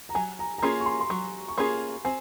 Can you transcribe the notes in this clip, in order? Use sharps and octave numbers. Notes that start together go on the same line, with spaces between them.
A#5
F#3 G#5
A#5
A#5
A#3 C#4 F4 G#4 C6
C#6
C6
C6
F#3 C#6
C#6
A#3 C#4 F4 G#4 C6
C4 G#5